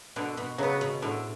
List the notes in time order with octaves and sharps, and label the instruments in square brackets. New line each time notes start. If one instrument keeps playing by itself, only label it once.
[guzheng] B2 [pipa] D3
[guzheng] B2
[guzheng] C#3 [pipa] F#3 B3
[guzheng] B2
[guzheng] A2 [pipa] D3